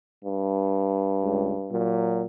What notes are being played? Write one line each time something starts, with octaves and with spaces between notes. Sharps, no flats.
G2
C#2
A#2 F#3